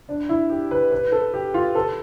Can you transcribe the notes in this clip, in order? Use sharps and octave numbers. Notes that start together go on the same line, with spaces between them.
D4
E4
G4
B4
B4
A4
G4
F4
A4